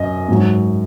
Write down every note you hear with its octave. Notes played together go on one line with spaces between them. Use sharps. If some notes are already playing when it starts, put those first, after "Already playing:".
Already playing: F#2 D#5
G#2 F#3